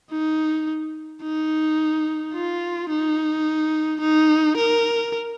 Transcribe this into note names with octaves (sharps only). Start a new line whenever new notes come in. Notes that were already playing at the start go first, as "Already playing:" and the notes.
D#4
D#4
F4
D#4
D#4
A#4